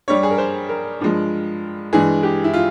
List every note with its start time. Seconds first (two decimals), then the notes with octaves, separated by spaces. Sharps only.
0.08 G2 G3 C#5
0.23 G#4
0.31 A#4
0.38 C5
0.69 A#4
1.00 G2 F3 G#3
1.93 G2 E3 G#3 G#4
2.23 G4
2.44 E4
2.54 F4